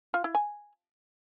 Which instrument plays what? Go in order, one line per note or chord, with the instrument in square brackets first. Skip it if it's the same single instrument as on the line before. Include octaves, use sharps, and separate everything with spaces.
[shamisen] F4
E4
G#5